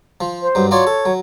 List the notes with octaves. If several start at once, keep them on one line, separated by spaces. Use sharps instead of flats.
F3
C5
G2 F#3
F#3 F4 C#5 D5
A4
F#3